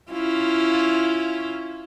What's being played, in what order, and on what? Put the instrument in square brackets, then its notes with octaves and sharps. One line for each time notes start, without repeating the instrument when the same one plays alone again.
[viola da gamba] C#4 E4 F4